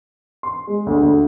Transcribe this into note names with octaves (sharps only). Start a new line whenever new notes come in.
C6
G#3
D2
D2